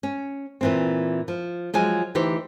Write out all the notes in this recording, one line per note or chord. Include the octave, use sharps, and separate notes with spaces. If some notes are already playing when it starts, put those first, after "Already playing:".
C#4
A#2 E3 C4
F3
F3 F#3 G#3 G#5
D2 E3 D#4 G4 C5